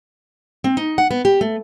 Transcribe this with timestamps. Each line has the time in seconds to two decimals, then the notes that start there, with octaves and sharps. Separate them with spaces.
0.64 C4
0.77 D#4
0.98 F#5
1.11 B3
1.25 G4
1.41 A3